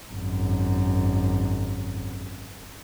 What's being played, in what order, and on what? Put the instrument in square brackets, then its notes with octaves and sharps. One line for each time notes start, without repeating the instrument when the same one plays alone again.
[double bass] G#1 F#2